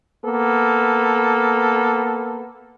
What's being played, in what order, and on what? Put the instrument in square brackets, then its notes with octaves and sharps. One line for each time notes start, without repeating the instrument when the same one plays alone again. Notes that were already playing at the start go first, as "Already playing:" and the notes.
[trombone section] A#3 B3 A4